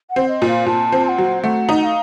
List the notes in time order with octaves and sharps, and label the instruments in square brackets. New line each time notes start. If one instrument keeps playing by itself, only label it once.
[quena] F#5
[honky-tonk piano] C4
[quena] D#5
[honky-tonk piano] A#2
[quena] F5
[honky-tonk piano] A#2 [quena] A5
[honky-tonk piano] C4
[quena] A5
F#5
[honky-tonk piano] F#3
[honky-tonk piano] A3 [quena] F#5
[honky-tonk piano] D#4
[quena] F#5
F5